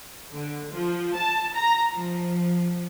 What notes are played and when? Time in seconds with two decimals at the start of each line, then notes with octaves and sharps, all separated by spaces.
0.34 D3
0.72 F3
1.15 A5
1.55 A#5
1.94 F3